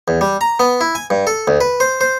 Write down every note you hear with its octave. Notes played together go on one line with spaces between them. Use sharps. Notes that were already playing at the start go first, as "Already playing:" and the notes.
E2
G3
A#5
B3
E4
G#5
G2
A4
D2
B4
C5
C5